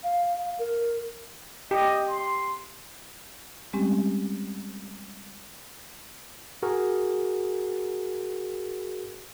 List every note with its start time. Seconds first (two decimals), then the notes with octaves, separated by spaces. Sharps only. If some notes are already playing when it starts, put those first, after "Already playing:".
0.04 F5
0.59 A#4
1.71 G4 D#5
2.07 C6
3.73 G3 G#3 C4 C#4 G4
6.63 F#4 G#4 A#4